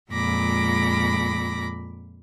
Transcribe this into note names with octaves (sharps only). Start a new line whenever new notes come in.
F2 A#2 G#3 B5 D6 A#6